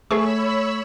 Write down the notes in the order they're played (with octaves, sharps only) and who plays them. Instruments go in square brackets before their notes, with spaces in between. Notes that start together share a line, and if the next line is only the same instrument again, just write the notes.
[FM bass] A3 [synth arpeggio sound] G#4 G#5 C#6 [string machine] C#5 B5 E6